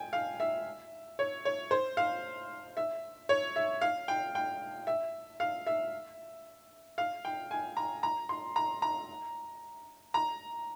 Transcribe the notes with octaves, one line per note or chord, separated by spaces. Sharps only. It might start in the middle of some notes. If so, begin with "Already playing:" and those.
Already playing: G5 G#5
F5
E5
C#5
C#5
C5
F5
E5
C#5
E5
F5
G5
G5
E5
F5
E5
F5
G5
G#5
A#5
A#5
C6
A#5
A#5
A#5